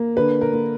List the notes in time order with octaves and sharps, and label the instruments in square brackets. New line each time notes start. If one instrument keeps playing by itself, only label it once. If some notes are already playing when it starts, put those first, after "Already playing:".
Already playing: [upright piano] A#3
D3 B4
A#4
A#3